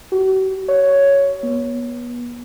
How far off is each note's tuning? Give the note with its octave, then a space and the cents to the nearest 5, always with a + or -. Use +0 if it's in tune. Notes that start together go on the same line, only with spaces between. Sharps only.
F#4 +45
C#5 +5
B3 -30